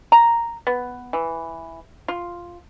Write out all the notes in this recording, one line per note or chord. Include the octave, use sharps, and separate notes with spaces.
A#5
B3
E3
F4